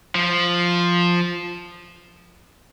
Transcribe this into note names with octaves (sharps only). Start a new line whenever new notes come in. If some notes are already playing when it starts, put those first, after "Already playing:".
F3